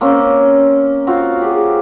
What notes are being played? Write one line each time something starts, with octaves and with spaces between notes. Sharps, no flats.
A#3 C4 C#4
C4 F4 F#4 F5
G4 G#4